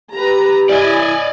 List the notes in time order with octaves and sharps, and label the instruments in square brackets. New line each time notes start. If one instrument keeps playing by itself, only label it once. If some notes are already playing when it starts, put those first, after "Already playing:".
[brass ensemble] G4 [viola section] B4 A#5
[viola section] E4 G#5 [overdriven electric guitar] D5 D#5